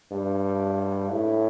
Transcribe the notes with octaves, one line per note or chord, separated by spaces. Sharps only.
G2
A2